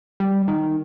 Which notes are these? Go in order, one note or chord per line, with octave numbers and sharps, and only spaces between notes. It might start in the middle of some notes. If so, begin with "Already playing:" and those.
G3
D#3